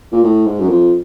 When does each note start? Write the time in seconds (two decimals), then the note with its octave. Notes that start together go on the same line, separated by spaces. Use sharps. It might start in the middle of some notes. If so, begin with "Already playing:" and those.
0.12 A#2
0.24 A2
0.46 G#2
0.60 F#2
0.69 F2